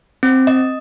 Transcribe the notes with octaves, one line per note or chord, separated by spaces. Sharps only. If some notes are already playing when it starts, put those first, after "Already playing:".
C4
D#5